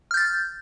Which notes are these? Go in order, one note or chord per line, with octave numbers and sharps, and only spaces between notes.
F6 G6 A6